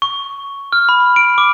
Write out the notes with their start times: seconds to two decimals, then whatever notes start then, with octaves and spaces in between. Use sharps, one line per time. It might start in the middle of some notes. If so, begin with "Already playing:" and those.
0.02 C#6
0.73 F6
0.89 B5
1.16 D7
1.38 D6